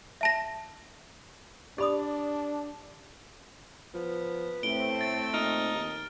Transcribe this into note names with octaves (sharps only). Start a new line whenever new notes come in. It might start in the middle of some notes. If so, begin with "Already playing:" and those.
E5 A5 A#6
D4 G4 D5 B5 D#6
F3 B3
A2 A3 C4 D7 G7
A6 D7
A#2 D#4 F6
D#2